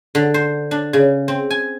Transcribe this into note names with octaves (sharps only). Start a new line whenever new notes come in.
D3
C5
D4
C#3
C4
G#5